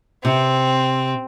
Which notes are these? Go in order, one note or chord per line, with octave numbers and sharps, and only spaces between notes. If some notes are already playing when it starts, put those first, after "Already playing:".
C3 C4